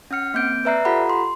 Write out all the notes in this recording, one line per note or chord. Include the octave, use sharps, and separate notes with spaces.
C#4 F#5 F6 C#7
A#3 C4 G6 D7
B4 D5 E5 A#5 F#6 C7
F4 G4 A4 F#5 A#5 B5
C6